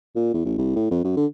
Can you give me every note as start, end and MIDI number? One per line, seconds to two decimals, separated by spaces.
0.16 0.31 46
0.34 0.43 40
0.45 0.57 33
0.58 0.73 36
0.76 0.87 45
0.91 1.00 41
1.05 1.15 42
1.17 1.26 50